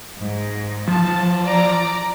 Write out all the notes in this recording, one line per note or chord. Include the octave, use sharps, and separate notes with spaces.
G#2
F3 A5
D5 A#5